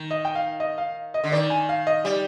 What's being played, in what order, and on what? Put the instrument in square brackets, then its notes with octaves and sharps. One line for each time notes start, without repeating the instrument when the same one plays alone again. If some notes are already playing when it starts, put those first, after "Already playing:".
Already playing: [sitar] D#3
[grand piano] D#5
G5
F5
D#5
F5
D#5
[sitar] D3
[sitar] D#3 [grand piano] D5
[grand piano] G#5
F5
D#5
[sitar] G3 [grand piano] D5